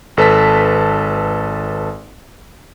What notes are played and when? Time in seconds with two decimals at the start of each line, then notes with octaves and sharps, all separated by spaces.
0.17 G#1 A4 B4 A5 B6